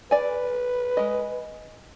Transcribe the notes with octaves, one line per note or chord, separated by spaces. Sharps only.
B4 D5 G#5
G#3 D#5